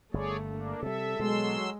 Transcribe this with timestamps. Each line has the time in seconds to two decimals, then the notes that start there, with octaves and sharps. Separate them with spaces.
0.14 G1 A3 G#4 C#5 D5
0.46 A#3 D4
0.83 C3 G3 A4 E5
1.19 B2 F#3 G#3 C6 E6